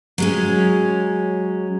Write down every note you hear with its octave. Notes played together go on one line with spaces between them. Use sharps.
F#3 G#3 C#4